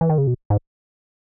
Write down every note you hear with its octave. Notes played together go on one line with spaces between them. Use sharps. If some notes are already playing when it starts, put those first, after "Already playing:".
E3
D#3
C#3
B2
G#2